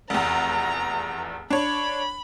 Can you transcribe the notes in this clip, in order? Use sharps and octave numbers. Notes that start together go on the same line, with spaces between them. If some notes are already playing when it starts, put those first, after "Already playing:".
F1 E2 A#5
D4 C#5 B5